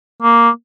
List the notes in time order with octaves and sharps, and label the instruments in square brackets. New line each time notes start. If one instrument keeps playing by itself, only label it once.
[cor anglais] A#3